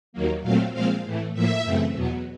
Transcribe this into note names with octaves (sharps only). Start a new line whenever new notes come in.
D#2 D#3 F#3 A#3
A#2 F#3 A3 C4 F5
A#2 F3 G#3 C4 F5
A2 E3 A3
A2 F3 A#3 E5
F#2 C#3 E3 A3 C4
E2 B2 F#3 B3